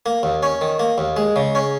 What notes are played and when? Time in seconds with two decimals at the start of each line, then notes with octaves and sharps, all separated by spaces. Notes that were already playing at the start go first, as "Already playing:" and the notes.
0.06 A#3
0.23 D#2
0.43 C#4
0.61 D#3
0.80 A#3
0.98 D#2
1.17 G#3
1.36 C#3
1.55 C#4